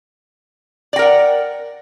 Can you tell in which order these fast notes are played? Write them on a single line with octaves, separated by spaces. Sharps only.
D5 G5 A#4 F#5